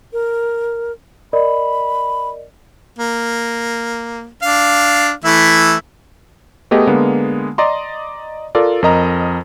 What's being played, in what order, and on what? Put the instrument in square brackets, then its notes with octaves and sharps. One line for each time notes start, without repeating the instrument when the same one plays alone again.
[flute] A#4
[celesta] A#4 D5 D#5 [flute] B5
[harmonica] A#3
D4 F5
E3 A3 E4
[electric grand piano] A3 B3 G4 G#4 D#5
D3 G#3 A#3 B3
D5 D#5 A#5 C6
F4 A4 A#4 D5
F2 A#4 D#5 A#5